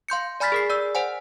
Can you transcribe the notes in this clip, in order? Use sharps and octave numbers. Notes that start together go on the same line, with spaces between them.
F5 C6 G6 C#7
D5 G#5 B5 F6 A6 B6
G#4 A#4 C7
D5 E6
C5 F#5 G#5